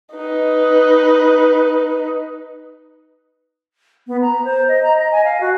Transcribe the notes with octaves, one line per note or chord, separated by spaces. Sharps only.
D#4 B4
B3
A#5
C5
D#5
A#5
D#5
G#5
F5
F#4